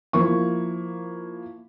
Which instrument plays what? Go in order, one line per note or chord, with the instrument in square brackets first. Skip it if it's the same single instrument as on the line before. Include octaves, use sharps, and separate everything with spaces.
[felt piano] F3 A#3 E4 C#6